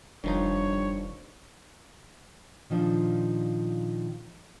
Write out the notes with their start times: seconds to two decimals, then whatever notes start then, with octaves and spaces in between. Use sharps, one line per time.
0.24 F1 G2 D#3 F3 D#4 C#5
2.70 A#2 D#3 F3 D4